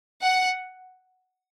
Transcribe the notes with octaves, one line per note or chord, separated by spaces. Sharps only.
F#5